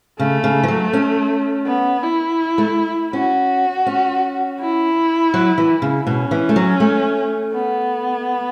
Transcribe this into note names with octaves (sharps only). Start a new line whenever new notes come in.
C#3 A3
C#3
E3
F#3
C#4
B3
E4
A3
C#4 F#4
C#4
E4
F#3
E3
C#3
B2 C#4
E3
A3
F#3
A3
B3